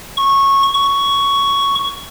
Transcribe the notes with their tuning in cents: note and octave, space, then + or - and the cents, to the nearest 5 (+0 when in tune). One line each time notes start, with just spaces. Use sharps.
C#6 -15
C#6 +5